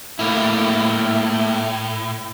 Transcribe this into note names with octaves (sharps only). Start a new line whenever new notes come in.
A2 A3 A#3 E4